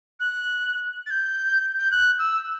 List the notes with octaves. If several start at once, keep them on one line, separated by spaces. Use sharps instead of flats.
F#6
A6
G6
G6
F#6
E6